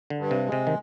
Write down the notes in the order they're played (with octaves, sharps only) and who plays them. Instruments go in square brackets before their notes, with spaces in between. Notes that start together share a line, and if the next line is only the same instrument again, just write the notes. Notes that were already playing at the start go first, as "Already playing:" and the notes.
[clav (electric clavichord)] D3
[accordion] G2
[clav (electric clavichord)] C3
[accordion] G#3
[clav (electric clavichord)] C3
D#3